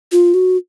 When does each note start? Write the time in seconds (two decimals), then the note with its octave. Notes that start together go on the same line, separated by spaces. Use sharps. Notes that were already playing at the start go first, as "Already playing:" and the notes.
0.12 F4
0.34 F#4